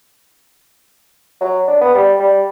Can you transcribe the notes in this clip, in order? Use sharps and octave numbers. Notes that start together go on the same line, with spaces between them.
F#3
D4
B3
G3
G3